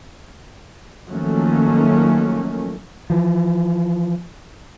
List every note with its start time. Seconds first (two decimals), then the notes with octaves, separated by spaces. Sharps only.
1.08 D#3 F3 F#3 A3 A#3 C#4
3.10 E3 F3